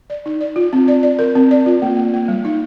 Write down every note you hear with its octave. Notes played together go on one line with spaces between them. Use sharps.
D5
D#4
D5
F4
C4
D5
D5
A#4
C4
D5
F4
A#3
A#3
A#3
G3
D#4